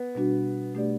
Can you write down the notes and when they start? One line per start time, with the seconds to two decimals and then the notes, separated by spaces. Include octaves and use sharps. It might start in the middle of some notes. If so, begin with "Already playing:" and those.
Already playing: B3
0.15 B2 G3 D4 F#4
0.74 B2 A3 D4 G4 D5